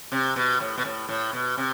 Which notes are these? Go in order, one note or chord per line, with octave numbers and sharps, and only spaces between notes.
C3
B2
A2
B2
A2
A2
B2
C3